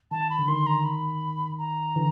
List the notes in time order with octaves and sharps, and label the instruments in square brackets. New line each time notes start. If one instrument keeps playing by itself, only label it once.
[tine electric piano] D#3 [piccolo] A5
[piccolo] B5
[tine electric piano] D3
[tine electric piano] D#3 [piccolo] C6
[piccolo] A#5
B5
A#5
[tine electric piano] D3 E3